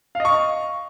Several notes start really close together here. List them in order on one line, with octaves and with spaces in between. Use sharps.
F5 D#5 C#6